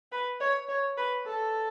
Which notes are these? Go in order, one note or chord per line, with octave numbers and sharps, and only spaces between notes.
B4
C#5
C#5
B4
A4